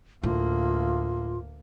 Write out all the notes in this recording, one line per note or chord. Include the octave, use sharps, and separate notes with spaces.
D2 A2 A#3 F4